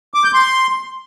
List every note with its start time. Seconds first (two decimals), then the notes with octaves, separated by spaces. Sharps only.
0.14 D6
0.24 G6
0.34 C6